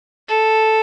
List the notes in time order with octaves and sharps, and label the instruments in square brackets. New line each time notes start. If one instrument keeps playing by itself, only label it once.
[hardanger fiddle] A4